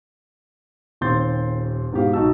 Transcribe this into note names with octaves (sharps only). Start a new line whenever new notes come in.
D#1 D#2 C4 C6 G6 A6
G#2 B2 G4 F5
B1 D#4 F#4 A5 E6